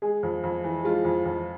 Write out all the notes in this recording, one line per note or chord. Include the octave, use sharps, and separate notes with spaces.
G#3 G#4
F2
F2
E3
G#3 F4
F2
F2